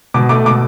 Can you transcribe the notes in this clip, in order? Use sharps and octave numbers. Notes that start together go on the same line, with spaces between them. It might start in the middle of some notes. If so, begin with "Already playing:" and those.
B2 D6
A3 D6
B2 D6